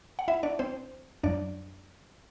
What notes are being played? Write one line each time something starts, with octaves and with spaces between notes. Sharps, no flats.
F#5
E4 E5
D4 D5
C4 C5
F#2 F#3 D4 D5